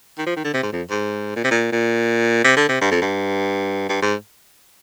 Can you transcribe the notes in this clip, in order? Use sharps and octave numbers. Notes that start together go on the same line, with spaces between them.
D#3
F3
D#3
D3
C3
G#2
F2
G#2
A#2
C3
A#2
A#2
C3
D3
C3
G2
F2
G2
G2
G#2